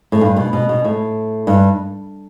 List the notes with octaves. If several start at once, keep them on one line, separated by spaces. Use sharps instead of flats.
A2
G2
B2
B2
B2
A2
G2